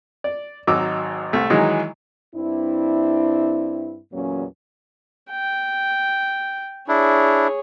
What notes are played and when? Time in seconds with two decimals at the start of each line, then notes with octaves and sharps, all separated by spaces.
0.24 D5
0.67 G#1 F#3 D#4 D6 E6
1.33 C2 A3
1.50 D#3 E3 F#3 G#3 D#4
2.34 G2 C4 D4 E4
4.12 E2 A#2 F#3 A#3 C#4
5.31 G5
6.88 D4 E4 G#4 C#5